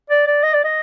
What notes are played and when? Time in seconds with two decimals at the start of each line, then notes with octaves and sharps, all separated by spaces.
0.10 D5
0.27 D5
0.43 D#5
0.53 D5
0.64 D#5